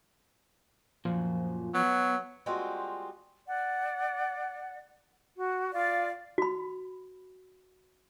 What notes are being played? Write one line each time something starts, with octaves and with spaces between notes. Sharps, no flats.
F#2 A#2 F3
F#3 B3
G3 G#3 A#3 C4 F4 F#4
D5 F#5
F#4
F4 D5 F5
F#4 B5